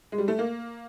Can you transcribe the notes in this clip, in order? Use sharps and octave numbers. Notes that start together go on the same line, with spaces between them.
G#3
G3
A3
A#3